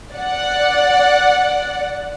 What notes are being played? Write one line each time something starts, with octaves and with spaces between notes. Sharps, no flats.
D5 F#5